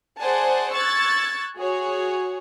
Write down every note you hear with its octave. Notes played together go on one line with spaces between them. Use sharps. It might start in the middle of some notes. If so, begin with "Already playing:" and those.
G#4 C5 D5 F#5 G#5 A5
C#6 E6 F#6 G#6 A6
F#4 G#4 C#5